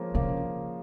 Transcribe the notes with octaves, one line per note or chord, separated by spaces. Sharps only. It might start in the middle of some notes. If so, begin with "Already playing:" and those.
Already playing: F3 G#3 A#3 C#4
C#3 F3 A#3